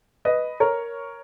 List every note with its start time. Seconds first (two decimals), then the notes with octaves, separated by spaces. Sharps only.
0.25 B4 D#5
0.60 A#4 C#5